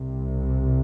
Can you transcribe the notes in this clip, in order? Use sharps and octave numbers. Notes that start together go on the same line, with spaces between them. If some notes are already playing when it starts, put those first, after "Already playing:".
Already playing: C2 C3